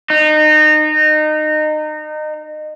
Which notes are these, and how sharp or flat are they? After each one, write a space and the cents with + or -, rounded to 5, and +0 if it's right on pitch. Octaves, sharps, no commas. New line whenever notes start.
D#4 -25